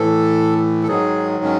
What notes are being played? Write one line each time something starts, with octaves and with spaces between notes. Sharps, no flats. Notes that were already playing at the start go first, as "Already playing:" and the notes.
Already playing: A2 E3 A4
A4
G#2 D#3 F#3 G#4
C#4